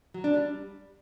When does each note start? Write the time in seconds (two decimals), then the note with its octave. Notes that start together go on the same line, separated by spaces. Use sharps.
0.14 F#3
0.24 D4
0.34 G3